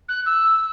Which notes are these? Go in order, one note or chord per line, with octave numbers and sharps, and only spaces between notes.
F#6
E6